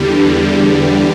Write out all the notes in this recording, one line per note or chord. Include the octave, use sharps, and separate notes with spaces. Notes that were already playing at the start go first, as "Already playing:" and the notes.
Already playing: E2 D3 G3